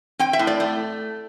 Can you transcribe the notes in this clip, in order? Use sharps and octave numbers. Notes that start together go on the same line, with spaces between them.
C4 G5
E5
A2
D5
A3